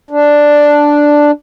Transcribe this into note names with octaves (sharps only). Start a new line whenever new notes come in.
D4